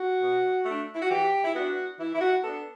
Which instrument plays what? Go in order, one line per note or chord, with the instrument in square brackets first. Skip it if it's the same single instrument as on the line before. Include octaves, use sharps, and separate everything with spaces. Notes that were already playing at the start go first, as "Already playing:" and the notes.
Already playing: [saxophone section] F#4
B2
A3 D4
E4
F#4
E3 G4
E4
B3 D4 F#4
E3 E4
E4
F#4
B3 D4 A4